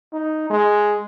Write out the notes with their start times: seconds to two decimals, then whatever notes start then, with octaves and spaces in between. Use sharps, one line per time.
0.13 D#4
0.50 G#3